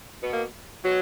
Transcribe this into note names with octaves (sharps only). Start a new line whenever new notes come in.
B2 B3
A#3
B2 F#3